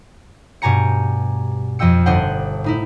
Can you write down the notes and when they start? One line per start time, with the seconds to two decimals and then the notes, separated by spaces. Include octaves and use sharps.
0.62 G2 B2 G4 G#5 A#5 C#7
1.79 F2 F3 D#5 G5 E6 C#7
2.06 G1 D4 C5 D#5 F#5 G5
2.64 A2 D#4 E4